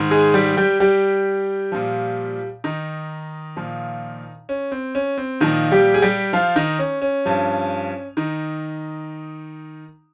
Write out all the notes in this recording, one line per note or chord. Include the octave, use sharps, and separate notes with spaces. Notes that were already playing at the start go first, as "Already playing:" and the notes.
Already playing: G#2 D#3
G#3 G#4
G3 G4
G3 G4
G3 G4
A#2 F3
D#3 D#4
A#2 F3
C#4
C4
C#4
C4
A#2 D#3 F3 D#4
G3 G4
G#4
G3 G4
F3 F4
D#3 D#4
C#4
C#4
G2 F3
D#3 D#4